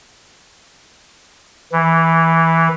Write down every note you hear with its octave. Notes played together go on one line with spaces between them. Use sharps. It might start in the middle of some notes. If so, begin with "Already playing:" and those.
E3